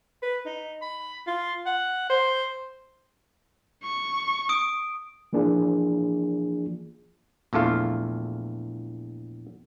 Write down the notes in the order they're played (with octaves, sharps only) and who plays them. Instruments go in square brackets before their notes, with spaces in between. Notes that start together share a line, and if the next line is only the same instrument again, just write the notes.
[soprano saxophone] B4
D#4
B5
F4
F#5
C5
[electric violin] C#6
[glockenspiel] D#6 D7
[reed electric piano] E3 F3 A#3 D4 F4 G#4
[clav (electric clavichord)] A#1 E2 A3 F4 F5